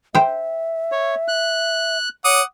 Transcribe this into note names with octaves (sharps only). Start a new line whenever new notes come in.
C5 E5 G5
C#5
F#6
C#5 F#5 D6 D#6